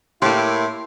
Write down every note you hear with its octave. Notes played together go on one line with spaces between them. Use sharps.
A2 A#3 E4 G4 C6